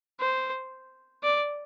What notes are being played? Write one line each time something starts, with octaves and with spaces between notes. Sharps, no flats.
C5
D5